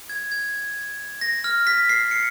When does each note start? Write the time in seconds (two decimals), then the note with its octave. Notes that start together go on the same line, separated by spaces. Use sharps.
0.09 G#6
0.32 G#6
1.21 A#6
1.44 F6
1.67 B6
1.89 C7
2.11 C#7